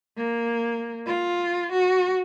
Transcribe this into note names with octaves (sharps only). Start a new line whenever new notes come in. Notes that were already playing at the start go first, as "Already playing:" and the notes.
A#3
F4
F#4